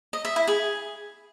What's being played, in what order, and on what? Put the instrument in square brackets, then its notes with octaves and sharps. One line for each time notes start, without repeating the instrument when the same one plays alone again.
[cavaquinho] D#5
E5
E4
G#4